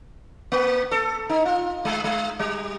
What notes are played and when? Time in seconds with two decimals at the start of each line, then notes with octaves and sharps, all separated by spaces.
0.52 A#3
0.91 A4
1.29 D#4
1.46 F4
1.85 G#3
2.04 G#3
2.39 G3